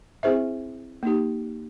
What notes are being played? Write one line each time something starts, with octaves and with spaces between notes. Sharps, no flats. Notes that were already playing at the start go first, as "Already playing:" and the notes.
C4 E4 G#4 C5 E5
A#3 D#4 G4